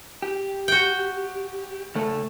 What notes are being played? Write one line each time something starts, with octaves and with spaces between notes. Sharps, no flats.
G4
F#4 G5
C#3 A3 A4